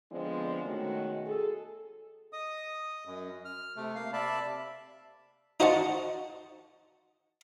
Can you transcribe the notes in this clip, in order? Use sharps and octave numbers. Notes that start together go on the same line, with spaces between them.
D3 F3 G#3 B3 C4 D4
B2 D#3 G#3 A3 C#4 F#4
G#4 A4
D#5 D#6
F#2
F6
C3 A3
A#3 F5
C3 D5 E5 A5 B5
D#4 F#4 C5 D#5 F#5 A5